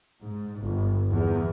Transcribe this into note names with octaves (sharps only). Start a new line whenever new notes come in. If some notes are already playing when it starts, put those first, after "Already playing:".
G#2
G1
E2